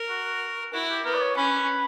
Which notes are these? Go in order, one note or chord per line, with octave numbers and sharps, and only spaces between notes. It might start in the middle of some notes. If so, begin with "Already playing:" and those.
Already playing: A#4
F#4
E4 F#4
G4
B3 A#4
D5
C#5
C#4 B4